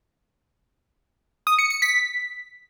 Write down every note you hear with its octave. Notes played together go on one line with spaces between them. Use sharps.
D#6
C#7
C#7
B6